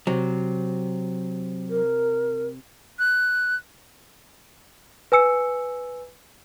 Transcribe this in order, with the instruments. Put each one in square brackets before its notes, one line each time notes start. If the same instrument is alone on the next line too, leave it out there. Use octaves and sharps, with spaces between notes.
[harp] C3 [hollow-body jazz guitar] F#3
[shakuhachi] A#4
[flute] F#6
[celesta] B4 G#5 E6 C#7